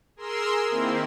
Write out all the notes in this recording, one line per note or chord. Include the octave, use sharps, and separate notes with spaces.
G#4 A#4 C6 E6
D#3 A#3 C4 E4